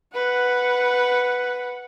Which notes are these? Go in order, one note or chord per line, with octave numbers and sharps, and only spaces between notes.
B4 F#5